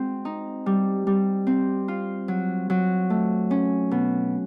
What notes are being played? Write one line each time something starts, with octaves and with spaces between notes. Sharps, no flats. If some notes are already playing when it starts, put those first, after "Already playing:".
Already playing: G#3 C4 F#4
D#4
G3
G3
C4
F4
F#3
F#3
A3
C#4
B2